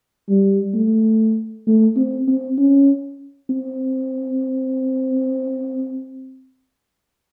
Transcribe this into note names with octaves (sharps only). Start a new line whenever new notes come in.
G3
A3
A3
C4
C4
C#4
C4